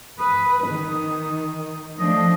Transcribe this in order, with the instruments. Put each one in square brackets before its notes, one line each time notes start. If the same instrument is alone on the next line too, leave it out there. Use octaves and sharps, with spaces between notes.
[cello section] B4 [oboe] D#6
[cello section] D#3
[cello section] F3 A3 D4 [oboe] D#5